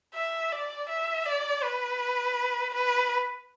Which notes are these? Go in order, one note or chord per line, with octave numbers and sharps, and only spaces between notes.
E5
D5
E5
D5
B4
B4